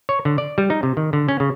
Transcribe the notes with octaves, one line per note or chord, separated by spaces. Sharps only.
C#5
D3
D5
G3
D#4
C3
D#3
D3
C#4
C#3